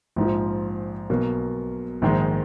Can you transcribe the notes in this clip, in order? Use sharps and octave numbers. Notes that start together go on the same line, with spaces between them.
A#1 G#2 F3
B1 B2 A#3
A#1 G#2 D#3 G#3 D#4